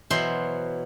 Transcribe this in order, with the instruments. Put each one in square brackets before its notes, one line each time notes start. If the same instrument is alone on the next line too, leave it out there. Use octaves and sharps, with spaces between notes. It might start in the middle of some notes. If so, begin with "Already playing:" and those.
[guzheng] B2 E3 F#3 C5 E5 C6